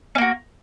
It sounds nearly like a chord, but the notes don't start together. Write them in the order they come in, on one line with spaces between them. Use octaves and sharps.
C#4 A#3 F#4